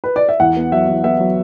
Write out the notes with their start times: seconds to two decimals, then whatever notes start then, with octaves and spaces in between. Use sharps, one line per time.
0.04 B4
0.16 D5
0.29 E5
0.40 E2 F#5
0.57 B3
0.72 F#3 E5
0.88 E2
1.04 B3 E5
1.20 F#3